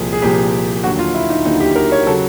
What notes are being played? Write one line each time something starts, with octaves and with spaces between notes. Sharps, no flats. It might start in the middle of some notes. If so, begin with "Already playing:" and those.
Already playing: C2 A#2 F3 G#4
G#4
C2 A#2 F3 G4
D#2 D3 F#3 F#4
F4
E4
D#4
D#2 D3 F#3 D#4
G4
A#4
C#5
C#3 F#3 A4